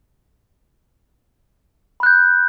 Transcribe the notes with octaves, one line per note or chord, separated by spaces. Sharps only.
B5 F#6 G6